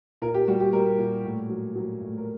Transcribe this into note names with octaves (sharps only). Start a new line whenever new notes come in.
A#2 A#4
G4
G3 F#4
G4
G3 A#4
A#2
A2
F#3
F#3
A2
A#4